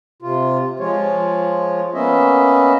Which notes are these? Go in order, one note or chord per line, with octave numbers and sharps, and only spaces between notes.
C3 F4
F3 G#3 F4 C#5
A#3 B3 C#4 D#5 E5